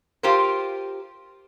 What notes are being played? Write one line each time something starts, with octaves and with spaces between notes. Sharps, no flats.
F4 G4 A#4 C5